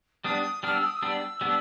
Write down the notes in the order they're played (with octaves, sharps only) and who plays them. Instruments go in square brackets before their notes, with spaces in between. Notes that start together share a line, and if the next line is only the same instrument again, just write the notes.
[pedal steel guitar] G3 B3 D4 [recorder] D#6
[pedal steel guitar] G3 B3 D4 [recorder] F6
[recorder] E6
D#6
E6
[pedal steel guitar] G3 B3 D4
G3 B3 D4